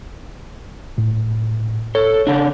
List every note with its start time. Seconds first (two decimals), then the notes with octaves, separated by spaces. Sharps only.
0.98 A2
1.95 A4 C#5
2.27 C#3 D4